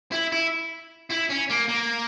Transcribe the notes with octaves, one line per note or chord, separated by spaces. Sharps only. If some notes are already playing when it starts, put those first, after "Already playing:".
E4
E4
E4
C#4
A#3
A#3